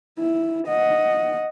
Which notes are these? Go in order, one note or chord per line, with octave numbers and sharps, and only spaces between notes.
E4
D#5 F#5